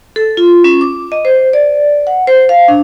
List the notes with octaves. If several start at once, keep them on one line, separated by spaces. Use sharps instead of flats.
A4
F4
C#4
D6
D#5
C5
D5
F#5
C5
F5
D4